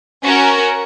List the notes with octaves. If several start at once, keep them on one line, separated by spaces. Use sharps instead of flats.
C#4 F#4 A#4